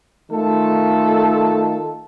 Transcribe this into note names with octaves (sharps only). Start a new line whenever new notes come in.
D#3 A3 F4 A4